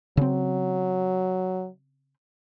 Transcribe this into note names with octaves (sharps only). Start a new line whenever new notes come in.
C#3 F#3 C4